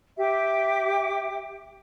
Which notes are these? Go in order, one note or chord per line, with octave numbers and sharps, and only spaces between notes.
G4 E5 G5 D6